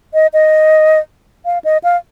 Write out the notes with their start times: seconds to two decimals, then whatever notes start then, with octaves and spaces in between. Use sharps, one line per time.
0.14 D#5
0.33 D#5
1.45 F5
1.64 D#5
1.84 F5